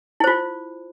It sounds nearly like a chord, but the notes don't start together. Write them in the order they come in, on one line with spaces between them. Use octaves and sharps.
E4 C5 F4